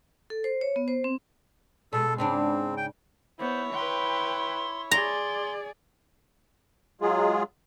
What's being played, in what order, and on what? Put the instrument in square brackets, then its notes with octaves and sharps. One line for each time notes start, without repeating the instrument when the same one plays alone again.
[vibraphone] A4
C5
C#5
B3
C5
C4
[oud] B2 G#3 [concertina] A4
[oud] G#2 C#3 D4 [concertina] C4
[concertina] G5
[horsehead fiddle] B3 [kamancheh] E4 C#5 [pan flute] C5
[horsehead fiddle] B4 G5 [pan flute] C6
[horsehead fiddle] G#4 D5 [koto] A#5 [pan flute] C6
[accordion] F#3 G#3 F4 G#4